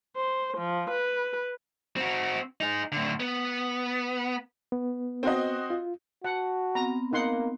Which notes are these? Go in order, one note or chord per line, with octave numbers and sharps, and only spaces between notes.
C5
F3
B4
C4 F#4
D#4 G#4
A2 D3
B3
B3
C4 F#4 D#5
F4
F#4 F#5 A5
B3 C4 A#5
A#3 D#4 F#5 C6